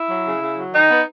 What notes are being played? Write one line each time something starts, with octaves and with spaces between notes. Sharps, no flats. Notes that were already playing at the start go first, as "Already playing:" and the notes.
Already playing: E4
F#3
C#3
C#3
F#3
D#3 D#4
B3